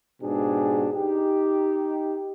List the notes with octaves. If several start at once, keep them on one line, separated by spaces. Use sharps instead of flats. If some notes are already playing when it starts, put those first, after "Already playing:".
G#2 B2 D4 G4 G#4
D#4 G4